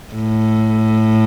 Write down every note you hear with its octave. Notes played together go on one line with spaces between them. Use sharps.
A2